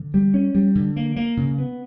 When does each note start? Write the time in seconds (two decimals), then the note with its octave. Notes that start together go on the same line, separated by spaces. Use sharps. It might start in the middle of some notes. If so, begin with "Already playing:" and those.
Already playing: D3
0.14 G3
0.34 C#4
0.55 G3
0.75 D3
0.96 A#3
1.16 A#3
1.37 C#3
1.58 B3